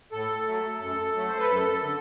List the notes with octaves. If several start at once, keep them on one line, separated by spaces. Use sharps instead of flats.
A2 A4
F#3 A3
F#2 A4
F#3 A3
C5
B4
F#2 A4
D3